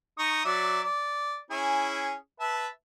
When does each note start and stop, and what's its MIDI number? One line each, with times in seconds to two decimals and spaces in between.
0.19 0.42 63
0.19 0.42 85
0.19 0.42 87
0.45 0.82 54
0.45 0.82 74
0.45 0.82 76
0.83 1.38 74
1.51 2.13 61
1.51 2.13 64
1.51 2.13 68
2.40 2.67 71
2.40 2.67 76
2.40 2.67 81